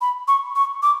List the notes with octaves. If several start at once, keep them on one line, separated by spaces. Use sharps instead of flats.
B5
C#6
C#6
D6